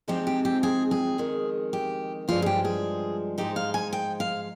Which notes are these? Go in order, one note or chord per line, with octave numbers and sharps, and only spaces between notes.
C3 F3 G#3 C4 D#4 G4
G4
G4
G#4
G#4
F2 D#3 G#3
G4
G2 F3 G#3 D4 F4
G#4
G4
G#4
G#2 F3 G#3 D#4 G4
F5
G#5
G5
F5